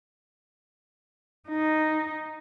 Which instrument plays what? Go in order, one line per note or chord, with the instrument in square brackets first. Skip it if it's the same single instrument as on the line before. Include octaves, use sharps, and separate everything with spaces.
[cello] D#4